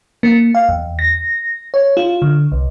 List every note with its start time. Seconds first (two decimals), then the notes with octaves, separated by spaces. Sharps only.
0.23 A#3
0.55 F5
0.69 E2
0.99 A#6
1.74 C#5
1.97 F4
2.22 D3
2.52 C2